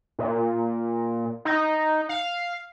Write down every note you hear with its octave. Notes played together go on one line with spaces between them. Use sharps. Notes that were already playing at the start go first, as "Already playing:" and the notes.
A#2
D#4
F5